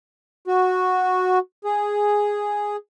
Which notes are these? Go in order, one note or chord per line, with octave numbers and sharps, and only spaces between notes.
F#4
G#4